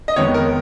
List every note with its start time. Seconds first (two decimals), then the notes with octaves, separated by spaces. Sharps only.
0.08 D#5
0.16 F2 D#3 G#3 B3 C#5
0.34 A#4